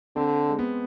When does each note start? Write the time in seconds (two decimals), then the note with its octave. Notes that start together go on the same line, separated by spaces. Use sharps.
0.16 D3 C4
0.49 G#3
0.59 B3